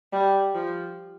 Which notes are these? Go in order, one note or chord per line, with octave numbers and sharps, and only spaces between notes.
G3
F3